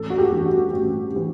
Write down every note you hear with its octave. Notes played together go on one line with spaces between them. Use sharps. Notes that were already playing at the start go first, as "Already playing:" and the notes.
Already playing: A1 A4
F#4
G4
G2 E3 G3
F#4
A1 F#4
E3 G3